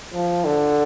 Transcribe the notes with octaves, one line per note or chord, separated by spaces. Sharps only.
F3
D3